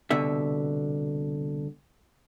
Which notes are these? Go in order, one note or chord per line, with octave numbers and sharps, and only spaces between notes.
C2 B2 D3 E5